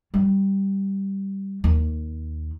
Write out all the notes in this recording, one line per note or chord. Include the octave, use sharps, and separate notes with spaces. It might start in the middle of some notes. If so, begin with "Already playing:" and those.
G3
D#2